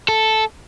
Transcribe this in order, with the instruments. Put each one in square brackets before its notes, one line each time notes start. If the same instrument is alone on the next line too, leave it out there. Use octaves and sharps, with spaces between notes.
[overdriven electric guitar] A4